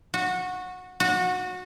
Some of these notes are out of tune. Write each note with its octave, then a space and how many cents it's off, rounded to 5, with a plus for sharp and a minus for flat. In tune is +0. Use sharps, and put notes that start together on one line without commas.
F#4 -15
F#4 -20